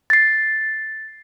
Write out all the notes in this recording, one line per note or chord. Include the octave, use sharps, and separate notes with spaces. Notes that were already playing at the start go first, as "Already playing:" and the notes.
A6 C7